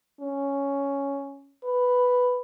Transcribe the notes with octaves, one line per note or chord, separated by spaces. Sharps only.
C#4
B4